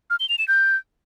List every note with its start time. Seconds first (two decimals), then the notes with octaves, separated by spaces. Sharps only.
0.10 F6
0.20 G7
0.29 F7
0.39 E7
0.48 G6